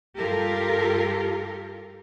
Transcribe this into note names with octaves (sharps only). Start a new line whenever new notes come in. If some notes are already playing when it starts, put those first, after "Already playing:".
G2 F4 G4 A4 A#4